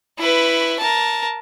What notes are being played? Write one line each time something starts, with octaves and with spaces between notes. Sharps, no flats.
E4 B4
A#4 A5